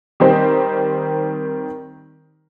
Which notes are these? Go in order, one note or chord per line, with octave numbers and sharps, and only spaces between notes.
D#3 G3 C4 D#4 G4 C5